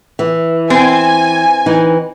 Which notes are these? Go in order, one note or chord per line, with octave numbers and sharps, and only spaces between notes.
E3
C4 G#5
E3 D#4